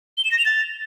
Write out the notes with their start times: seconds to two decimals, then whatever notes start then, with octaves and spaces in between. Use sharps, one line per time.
0.18 G7
0.25 E7
0.32 A#6
0.39 F7
0.45 A6